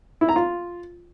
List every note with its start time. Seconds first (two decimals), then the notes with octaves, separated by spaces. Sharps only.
0.21 E4
0.29 A#5
0.36 F4